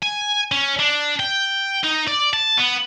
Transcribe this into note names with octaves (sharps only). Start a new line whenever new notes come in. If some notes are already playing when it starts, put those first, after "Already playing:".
G#5
C#4
D4
G5
D#4
D5
A5
B3